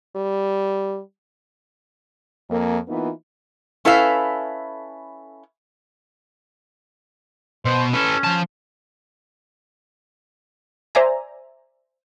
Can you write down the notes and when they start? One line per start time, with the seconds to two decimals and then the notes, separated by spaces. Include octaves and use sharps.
0.16 G3
2.50 F2 A#3
2.88 E3 A#3 B3 D#4 F4
3.85 C#4 E4 A4 B4 E5 F5
7.65 B2 C5
7.94 C#4 A4 B4
8.24 F3 A5
10.95 C5 D5 E5 G#5 A#5